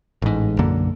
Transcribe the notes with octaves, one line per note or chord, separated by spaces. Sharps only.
A1 G#2
B1 F#2 D3 A#3